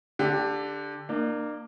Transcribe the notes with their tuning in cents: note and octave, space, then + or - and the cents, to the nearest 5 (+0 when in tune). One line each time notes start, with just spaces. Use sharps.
D3 +0 D4 +0 G4 +25
A#3 +0 D4 +40